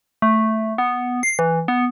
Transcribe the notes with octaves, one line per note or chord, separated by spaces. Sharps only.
A3
B3
C7
E3
B3